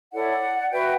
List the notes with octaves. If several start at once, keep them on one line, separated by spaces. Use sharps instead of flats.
E4 A4 C#5 D5 F#5
F#4 B4 E5 G5